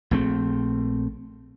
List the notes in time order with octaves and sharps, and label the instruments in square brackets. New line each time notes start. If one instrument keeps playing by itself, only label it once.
[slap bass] A#1 A3 C4